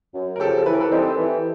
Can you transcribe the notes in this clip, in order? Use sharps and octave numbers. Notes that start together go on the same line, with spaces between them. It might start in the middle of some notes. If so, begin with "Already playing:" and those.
F#2
A#4
C#3 F3 G4 A4
E3 B4
A#4
A4 B4
G3 C4 D#4 G4 A4
E3